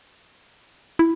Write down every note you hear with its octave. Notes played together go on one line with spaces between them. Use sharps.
E4